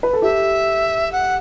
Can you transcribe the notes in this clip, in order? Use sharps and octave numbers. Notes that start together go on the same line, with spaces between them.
B4
A4
G4 E5
F#5